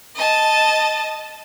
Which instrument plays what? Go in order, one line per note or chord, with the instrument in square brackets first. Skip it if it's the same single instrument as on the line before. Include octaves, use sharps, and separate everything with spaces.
[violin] D#5 A5